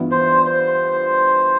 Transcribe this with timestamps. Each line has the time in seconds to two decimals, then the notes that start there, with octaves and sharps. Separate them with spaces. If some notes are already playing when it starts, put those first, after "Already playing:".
Already playing: G2 E3 B3 F4
0.11 C5
0.46 C5